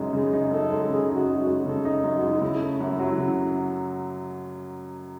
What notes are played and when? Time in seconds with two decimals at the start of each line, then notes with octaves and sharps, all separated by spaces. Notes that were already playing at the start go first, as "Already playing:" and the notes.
Already playing: F#2 C#3 G#3 D#4
0.13 C#3 G#4
0.33 D#4
0.51 F#2 A4
0.70 G#3
0.89 C#3 G#4
1.09 D#4
1.15 F#4
1.28 F#2
1.40 F#4
1.46 G#3
1.66 C#3 A4
1.85 D#4
2.04 F#2
2.17 F#4
2.22 G#3
2.31 D#4
2.41 C#3 E4
2.61 A3
2.80 F#2
2.99 F#3
3.18 C#3